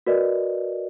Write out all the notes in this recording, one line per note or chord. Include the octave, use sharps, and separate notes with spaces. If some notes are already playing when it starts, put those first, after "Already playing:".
F#4 A#4 B4 D5 D#5